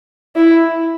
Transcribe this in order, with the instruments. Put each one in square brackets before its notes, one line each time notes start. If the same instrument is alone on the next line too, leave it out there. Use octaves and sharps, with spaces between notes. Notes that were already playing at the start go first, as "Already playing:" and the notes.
[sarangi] E4